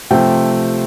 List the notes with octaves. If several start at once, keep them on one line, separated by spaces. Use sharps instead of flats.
C3 F3 A3 C4 G5